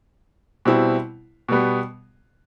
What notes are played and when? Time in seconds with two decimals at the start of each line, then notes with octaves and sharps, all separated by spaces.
0.65 B2 G3 C4 E4
1.48 B2 G3 B3